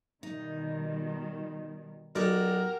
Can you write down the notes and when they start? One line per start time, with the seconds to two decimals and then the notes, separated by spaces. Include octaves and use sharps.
0.23 B2 D#3 G3 D#4
2.16 B1 F#4 G4 A#4 D5